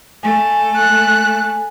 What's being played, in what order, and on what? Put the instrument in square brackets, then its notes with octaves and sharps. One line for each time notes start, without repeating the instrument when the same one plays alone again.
[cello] A3 A4 [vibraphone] G#5
[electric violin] F#6